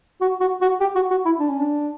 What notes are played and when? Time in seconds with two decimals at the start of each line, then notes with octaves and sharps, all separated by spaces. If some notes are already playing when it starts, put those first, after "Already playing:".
0.21 F#4
0.41 F#4
0.61 F#4
0.81 G4
0.96 F#4
1.11 F#4
1.25 E4
1.40 D4
1.50 C#4
1.60 D4